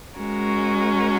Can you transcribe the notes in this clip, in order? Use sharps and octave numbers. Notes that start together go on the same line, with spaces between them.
G#3 C#4 F#4 A#4